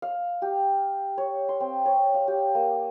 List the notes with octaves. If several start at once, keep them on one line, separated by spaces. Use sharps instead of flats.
F5
G4
C#5
C6
C4
C#5
F5
G4
A#3